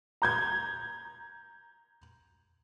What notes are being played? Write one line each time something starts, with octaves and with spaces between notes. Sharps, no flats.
A#5 G6 G#6